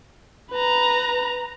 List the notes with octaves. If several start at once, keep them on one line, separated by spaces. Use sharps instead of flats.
B4 A#5